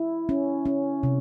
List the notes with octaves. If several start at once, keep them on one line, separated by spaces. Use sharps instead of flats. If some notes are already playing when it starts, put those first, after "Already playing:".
Already playing: E4
C#4
C#4
C3